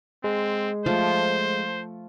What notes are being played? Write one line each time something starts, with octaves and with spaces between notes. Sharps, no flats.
G#3 C4
F3 A3 F4 C5